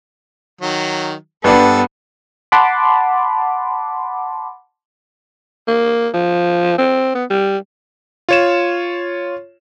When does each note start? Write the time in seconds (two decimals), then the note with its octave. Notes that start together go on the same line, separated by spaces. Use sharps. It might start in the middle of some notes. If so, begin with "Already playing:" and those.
0.61 D#3 F#3
1.44 G2 B3 D4 A4
2.52 F#5 A5 B5 C6 D6
5.68 A#3
6.14 F3
6.78 C4
7.15 B3
7.30 G3
8.29 F4 C#5 E7